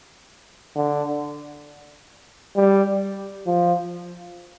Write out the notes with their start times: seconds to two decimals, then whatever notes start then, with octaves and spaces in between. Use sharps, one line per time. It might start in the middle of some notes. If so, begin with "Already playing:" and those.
0.76 D3
2.56 G3
3.46 F3